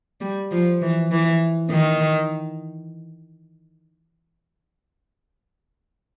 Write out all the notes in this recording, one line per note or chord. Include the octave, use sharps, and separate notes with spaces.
G3
F3
E3
E3
D#3